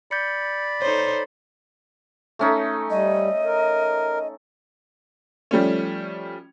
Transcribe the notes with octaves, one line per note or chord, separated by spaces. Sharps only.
D5 B5 G6 C#7
D#4 A4 C5 C#5
A3 C#4 D#4
G3 D#5
A#4
F3 G3 A3 C#4